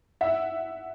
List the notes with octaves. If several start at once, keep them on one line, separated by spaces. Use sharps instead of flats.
E5 F#5